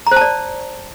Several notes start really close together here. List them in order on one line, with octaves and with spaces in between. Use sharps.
A#5 C5 A5 D5